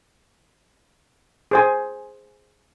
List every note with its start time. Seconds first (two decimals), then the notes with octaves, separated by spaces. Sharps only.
1.51 G#4 C5 G#5